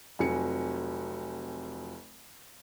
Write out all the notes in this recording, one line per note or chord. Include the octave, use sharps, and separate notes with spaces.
F1 F2 F#3 G#5 C#7